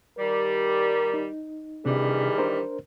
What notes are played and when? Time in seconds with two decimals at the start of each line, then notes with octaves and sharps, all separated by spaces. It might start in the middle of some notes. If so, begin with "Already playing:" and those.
0.18 D#3 G3 A#4
1.14 D#4
1.85 C3 D#3 E3 G3 D4 G#4
2.38 D4 A#4 C5